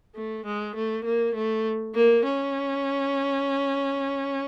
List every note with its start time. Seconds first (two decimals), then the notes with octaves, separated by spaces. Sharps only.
0.15 A3
0.46 G#3
0.75 A3
1.04 A#3
1.35 A3
1.95 A#3
2.25 C#4